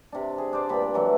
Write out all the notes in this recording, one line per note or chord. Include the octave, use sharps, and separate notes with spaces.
C3 D4
G#4
D4 C5 D5
G2 A#2 C4 B5
E3 F#3 A3